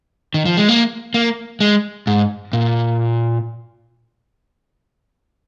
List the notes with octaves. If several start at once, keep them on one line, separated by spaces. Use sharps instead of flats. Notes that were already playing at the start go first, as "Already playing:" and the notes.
D#3
F3
G#3
A#3
A#3
G#3
G#2
A#2